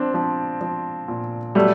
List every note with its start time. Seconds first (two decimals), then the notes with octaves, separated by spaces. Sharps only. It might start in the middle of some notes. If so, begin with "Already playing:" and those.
Already playing: F3 C4 D4
0.14 F3
0.61 F3
1.08 A#2
1.55 F#3 G3 A3